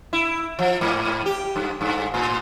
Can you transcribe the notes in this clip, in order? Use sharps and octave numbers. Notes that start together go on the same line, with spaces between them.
E4
F3
G#2
G4
G2
G2
A2